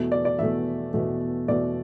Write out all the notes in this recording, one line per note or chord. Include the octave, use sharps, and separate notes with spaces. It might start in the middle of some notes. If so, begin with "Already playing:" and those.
Already playing: E2 B2 A3
D5
D5
E2 B2 A3 E5
E2 B2 A3
E2 B2 A3 D5